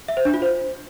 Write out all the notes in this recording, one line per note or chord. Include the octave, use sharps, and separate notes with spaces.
E5
C5
D4
F4
C5